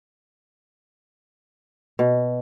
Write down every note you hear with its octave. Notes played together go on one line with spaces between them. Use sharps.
B2